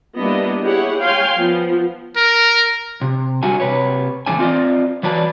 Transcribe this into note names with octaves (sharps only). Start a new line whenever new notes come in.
G3 A#3 B3 D4 E4 D#5
E4 G4 G#4 C#5 F#5
C#5 F5 G5 G#5 C6
F3 B3
A#4
C3
G3 D4 F#4 E5 G#5
C3 B4 C#5
A2 D3 E3 A3 D4 G#5
C4 F4 D5 D#5
E3 F#3 B4 D5 A5